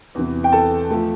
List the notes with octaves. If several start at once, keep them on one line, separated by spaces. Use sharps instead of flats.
E2 C3 E3
G5
A4 A5
F3 A3